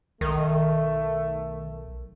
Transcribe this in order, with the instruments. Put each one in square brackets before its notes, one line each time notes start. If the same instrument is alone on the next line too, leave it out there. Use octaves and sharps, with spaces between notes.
[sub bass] B1 [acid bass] D#3 [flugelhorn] A3